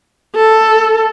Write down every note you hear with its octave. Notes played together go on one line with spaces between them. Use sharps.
A4